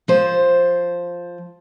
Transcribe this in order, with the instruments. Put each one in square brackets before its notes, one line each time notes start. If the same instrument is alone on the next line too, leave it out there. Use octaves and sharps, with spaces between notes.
[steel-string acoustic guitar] F3 C5